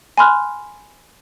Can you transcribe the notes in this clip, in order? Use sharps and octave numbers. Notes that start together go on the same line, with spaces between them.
G#5 B5 C6 F6 F#6